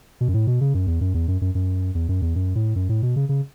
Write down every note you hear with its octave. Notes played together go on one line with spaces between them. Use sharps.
B2
F#2
A2
B2
C#3
F#2
E2
F#2
E2
F#2
F#2
F#2
E2
F#2
E2
F#2
A2
F#2
A2
B2
C#3
C#3